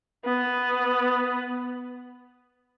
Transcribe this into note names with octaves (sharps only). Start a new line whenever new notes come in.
B3